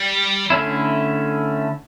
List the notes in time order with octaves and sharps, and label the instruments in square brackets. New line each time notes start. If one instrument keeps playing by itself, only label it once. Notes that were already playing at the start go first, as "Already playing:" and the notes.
Already playing: [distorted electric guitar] G3
[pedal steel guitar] D3 A3 C#4 E4